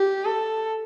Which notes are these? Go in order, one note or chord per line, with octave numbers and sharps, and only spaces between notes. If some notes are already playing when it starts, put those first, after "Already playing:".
Already playing: G4
A4